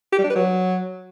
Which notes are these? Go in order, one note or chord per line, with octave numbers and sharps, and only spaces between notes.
G4
G3
D4
B4
F#3